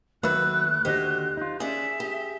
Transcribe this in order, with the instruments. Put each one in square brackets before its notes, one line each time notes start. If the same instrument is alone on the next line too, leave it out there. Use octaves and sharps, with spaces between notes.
[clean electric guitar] D#2 A3 E5 [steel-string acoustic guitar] F#3 B4 [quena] F#6
[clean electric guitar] D#2 D3 F#4 [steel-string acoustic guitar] G4 C5 D#5
[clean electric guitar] D#4 F4
[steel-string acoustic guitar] C#4 D5 [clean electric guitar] G#4 [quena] E5
[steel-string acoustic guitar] G4